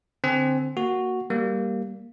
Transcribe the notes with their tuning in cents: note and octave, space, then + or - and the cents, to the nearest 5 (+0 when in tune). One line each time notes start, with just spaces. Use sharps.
D3 +0 C4 +0 G#5 +15
A#3 +0 F#4 +0
G3 +0 A#3 +0